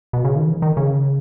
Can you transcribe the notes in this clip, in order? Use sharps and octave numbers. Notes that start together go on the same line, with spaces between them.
B2
C#3
D#3
E3
D#3
C#3